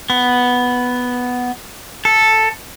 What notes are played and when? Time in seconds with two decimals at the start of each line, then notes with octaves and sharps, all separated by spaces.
0.10 B3
2.05 A4